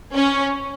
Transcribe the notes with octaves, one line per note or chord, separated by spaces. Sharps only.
C#4